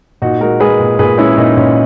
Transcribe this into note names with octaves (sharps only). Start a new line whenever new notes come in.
A#2 D#4 F#4
G#3 F#4 A#4
G#3 G#4 B4
A#2
A#2 G#4 B4
G#3 C#4 E4
A#2 D#4
A#2 C#4